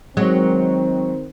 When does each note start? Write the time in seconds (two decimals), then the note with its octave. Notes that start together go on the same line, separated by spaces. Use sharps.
0.17 D#3 F#3 G#3 C4